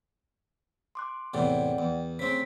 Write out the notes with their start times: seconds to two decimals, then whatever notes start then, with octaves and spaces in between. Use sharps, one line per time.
0.95 C6 D6 F#6
1.34 E2 A2 C3 D5 F#5 G5
1.78 E2
2.19 C#3 A3 C4 C5 B6